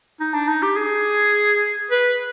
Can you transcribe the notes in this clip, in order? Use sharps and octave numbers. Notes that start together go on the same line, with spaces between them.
D#4
D4
D#4
G4
G#4
B4